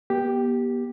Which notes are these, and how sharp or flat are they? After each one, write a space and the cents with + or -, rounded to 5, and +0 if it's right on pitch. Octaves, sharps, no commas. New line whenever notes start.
B3 -40 G4 +0